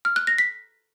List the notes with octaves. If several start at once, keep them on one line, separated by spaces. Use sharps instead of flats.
F6
F#6
A#6
B6